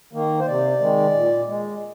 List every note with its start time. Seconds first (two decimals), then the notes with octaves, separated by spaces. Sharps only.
0.13 D#3 A#3
0.39 C5
0.47 C3 D5
0.80 D#3 G#3
1.15 A#2
1.47 G#3